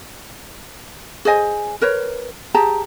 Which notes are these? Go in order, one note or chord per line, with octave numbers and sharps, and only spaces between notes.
G#4 C5 D#5 G#5
A#4 B4 C#5
G4 G#4 A5 A#5